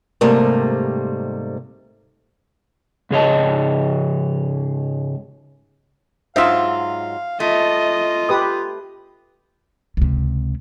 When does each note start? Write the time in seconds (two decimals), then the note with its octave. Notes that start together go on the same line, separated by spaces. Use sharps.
0.21 G#2 C3 G3 A3 A#3
3.11 G#2 C#3 G#4 C#5 D#5 A5
6.36 G#2 F#3 F4 C5 E5 F5
7.40 A3 F4 D#5
8.29 G4 B4 D#6
9.97 C#2 C3